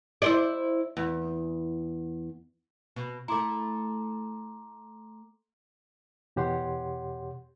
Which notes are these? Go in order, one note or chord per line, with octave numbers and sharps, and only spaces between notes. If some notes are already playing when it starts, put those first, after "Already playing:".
E4 C5 D5
E2
B2
A3 E4 A#5 C6 D6
E2 B2 G4 C#5 F#5 C6